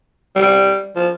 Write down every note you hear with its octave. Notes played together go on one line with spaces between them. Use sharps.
G3
F3